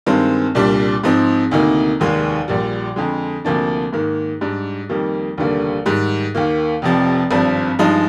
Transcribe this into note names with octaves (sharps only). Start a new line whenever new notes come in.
G2 D#3 G#3 C4
C2 A#2 G3 D4
G#2 F3 C4 D#4
D2 C3 D#3 A#3 D#4
F1 D#2 D#3 G#3
A#1 A#2 G3
F2 D3 G#3
D2 C3 F3 A#3 D4
G#2 D#3 A#3
G#2 G3 D4
F2 D#3 G3 A#3
F1 D#2 D3 G3 A#3
G#2 D#3 G3
D#2 D#3 A#3
F1 F2 C3 F3
G#1 G2 F3 C4
G2 F3 G#3 D#4